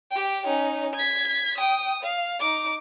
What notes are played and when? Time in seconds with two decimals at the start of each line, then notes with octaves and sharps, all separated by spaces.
0.11 G4 G5
0.46 C#4 D#4
0.95 G#6 B6
1.58 G5 D#6
2.03 F5
2.39 D#4 D6